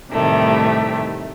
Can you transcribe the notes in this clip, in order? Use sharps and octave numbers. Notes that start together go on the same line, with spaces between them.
A2 C3 D#3 E3 G3 A3